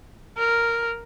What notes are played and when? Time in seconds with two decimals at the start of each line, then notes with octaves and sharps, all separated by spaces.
0.38 A#4